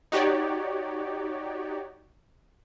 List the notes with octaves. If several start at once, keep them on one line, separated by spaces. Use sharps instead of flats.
D#4 F#4 G4 C#5 D5